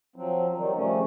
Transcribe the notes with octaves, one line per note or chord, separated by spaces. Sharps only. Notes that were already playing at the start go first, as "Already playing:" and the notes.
F3 F#3 C4
D#3 F#3 G3
C#3 F3 G3 A3 C#4